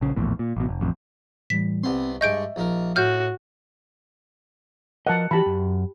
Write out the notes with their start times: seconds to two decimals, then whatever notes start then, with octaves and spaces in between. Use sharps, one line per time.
0.01 A#1 C#3
0.16 A#1 E2 A2
0.39 A#2
0.57 A1 B2
0.69 F1
0.81 A1 F2
1.50 A2 E3 G3 B6
1.84 C2 B3 C4 C6
2.21 G2 G#3 D#5 E5 C#6 G6 D7
2.56 A#1 D#4 A#4
2.96 A2 F#4 F6 G6
5.07 F3 A#4 D#5 F#5 A5
5.31 E3 F3 F#4 G4 A5 B5
5.46 F#2